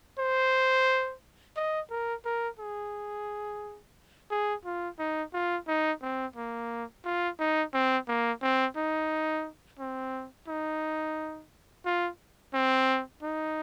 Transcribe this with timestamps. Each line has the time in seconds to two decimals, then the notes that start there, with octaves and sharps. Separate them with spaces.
0.19 C5
1.56 D#5
1.91 A#4
2.25 A#4
2.59 G#4
4.31 G#4
4.65 F4
4.99 D#4
5.34 F4
5.68 D#4
6.02 C4
6.36 A#3
7.05 F4
7.39 D#4
7.74 C4
8.08 A#3
8.42 C4
8.77 D#4
9.79 C4
10.48 D#4
11.85 F4
12.54 C4
13.22 D#4